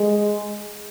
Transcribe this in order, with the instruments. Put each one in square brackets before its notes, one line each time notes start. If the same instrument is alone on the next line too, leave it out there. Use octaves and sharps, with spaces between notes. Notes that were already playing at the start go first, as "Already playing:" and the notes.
Already playing: [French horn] G#3